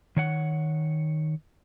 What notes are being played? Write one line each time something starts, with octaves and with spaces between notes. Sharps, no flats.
D#3 C#5 F#5